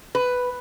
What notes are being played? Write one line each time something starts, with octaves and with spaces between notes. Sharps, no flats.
B4